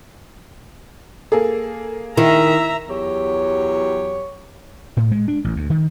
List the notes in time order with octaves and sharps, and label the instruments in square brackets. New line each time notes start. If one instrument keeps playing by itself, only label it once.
[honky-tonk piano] A#3 G#4 [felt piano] A4
[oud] D#3 [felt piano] E4 [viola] E5 A#5
[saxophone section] E2 F#3 G4 C#5
[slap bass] A2
G#3
D4
A1
D2
D#3